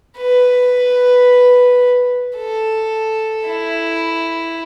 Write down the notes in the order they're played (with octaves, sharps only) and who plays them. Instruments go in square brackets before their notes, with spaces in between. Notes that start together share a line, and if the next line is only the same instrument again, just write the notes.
[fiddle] B4
A4
E4